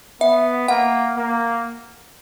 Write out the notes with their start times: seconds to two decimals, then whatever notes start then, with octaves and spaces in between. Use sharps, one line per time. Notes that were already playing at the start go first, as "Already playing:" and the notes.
0.21 B3 E5
0.68 A#3 F#5
1.16 A#3